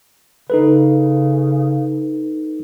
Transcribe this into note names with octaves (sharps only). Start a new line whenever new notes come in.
C#3 D#4 A4 B4